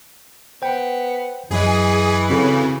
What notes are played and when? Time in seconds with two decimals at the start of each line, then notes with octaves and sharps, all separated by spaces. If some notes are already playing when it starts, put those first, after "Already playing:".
0.62 B3 C5 G5
1.51 F#2 E3 F#3 G#4 D#5
2.30 C#3 C4 F#4 A4